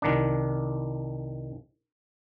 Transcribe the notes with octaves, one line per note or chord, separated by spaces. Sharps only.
C2 D#3 D4